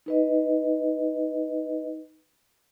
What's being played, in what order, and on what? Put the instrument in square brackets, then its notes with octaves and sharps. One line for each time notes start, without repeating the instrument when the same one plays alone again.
[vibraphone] D#4 B4 D#5